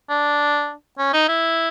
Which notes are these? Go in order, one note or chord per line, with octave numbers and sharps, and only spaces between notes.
D4
C#4
D#4
E4